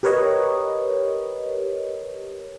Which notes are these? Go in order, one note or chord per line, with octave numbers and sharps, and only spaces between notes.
G4 A#4 B4 C#5 D#5